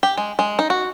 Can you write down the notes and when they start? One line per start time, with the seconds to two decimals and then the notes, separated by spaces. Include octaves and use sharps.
0.03 G4
0.17 G#3
0.39 G#3
0.59 D#4
0.70 F#4